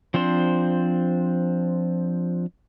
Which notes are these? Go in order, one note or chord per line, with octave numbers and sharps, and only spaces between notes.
F3 C4 D4 C5